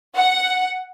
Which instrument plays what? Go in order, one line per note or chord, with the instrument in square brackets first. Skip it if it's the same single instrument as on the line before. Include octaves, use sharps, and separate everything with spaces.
[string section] F#5